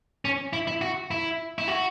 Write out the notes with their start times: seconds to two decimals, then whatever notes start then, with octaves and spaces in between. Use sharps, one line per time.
0.25 C#4
0.53 E4
0.67 E4
0.81 F#4
1.11 E4
1.58 E4
1.68 F#4